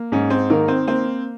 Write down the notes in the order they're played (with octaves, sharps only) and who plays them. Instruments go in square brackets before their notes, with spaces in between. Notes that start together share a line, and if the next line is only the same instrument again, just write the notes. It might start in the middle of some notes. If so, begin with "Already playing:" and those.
Already playing: [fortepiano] A#3
[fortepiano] G#2 [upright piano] C#4
[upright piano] C4
[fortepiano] D#3 [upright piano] A#3
[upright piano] C4
[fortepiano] A#3 [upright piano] C4